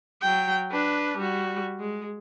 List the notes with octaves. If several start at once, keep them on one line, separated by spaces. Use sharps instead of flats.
F#3 G5
D4 B4
G3 F#4
G#3